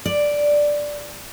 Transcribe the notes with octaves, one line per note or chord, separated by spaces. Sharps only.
D5